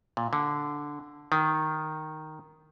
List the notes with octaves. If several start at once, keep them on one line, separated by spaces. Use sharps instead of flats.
A#2
D3
D#3